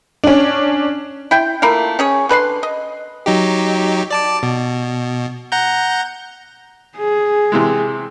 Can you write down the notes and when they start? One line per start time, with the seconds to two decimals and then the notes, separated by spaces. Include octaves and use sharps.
0.24 C#4 D4
1.31 E4 G5 C6
1.62 A3 A#3 E4 F4
1.99 C#4 G#4 C#5
2.29 D3 B4 D5 C6
2.63 D#5
3.26 F#3 D#4 G4
4.11 D5 A5 D6
4.43 B2
5.52 F#5 A#5 G6
6.97 G#4
7.52 C3 E3 G#3